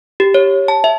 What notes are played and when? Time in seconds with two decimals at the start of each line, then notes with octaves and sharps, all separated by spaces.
0.20 G4
0.34 C#5
0.68 A5
0.84 E5